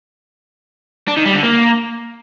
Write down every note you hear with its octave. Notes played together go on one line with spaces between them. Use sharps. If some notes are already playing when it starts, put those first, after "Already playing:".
D4
D#3
G3
D3
A#3